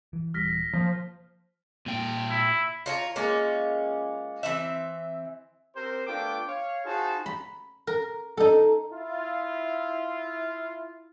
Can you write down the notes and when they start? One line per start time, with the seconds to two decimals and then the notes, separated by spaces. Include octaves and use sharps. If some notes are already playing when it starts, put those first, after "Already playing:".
0.13 E3
0.34 D#1 E3 G3 F6 A#6 B6
0.73 F3 A#3
1.86 A#2 G5
2.30 E4
2.86 F4 C#5 A#5
3.16 G#3 A#3 C#4 F4
4.43 E3 C4 E5
5.76 C4 G4 A#4 C5
6.07 A3 B3 D4 F4 G5 D6
6.49 C#5 F5
6.85 D#4 F4 F#4 G#4 C5 A5
7.26 B5
7.87 A#4
8.37 D#4 A4
8.92 E4 F4